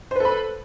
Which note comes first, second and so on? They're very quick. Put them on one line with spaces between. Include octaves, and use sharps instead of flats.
C5 B4 A4 B5